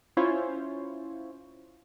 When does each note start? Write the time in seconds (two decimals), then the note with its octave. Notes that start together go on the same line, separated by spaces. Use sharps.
0.17 C#4 E4 F4 C5 C#5